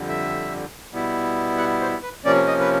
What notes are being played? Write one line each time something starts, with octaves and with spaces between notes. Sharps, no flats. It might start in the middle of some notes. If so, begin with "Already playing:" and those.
Already playing: F2 D3 G3
E5
B2 G3 B3 E4
F#5
C5
B4
C3 F3 A#3 C#4 D5
D#5
B4